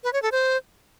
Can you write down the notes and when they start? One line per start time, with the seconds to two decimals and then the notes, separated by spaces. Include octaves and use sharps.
0.04 B4
0.13 C#5
0.22 A4
0.32 C5